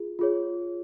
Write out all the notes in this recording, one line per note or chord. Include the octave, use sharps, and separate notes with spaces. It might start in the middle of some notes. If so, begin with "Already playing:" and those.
Already playing: F4 G#4
F4 G#4 C#5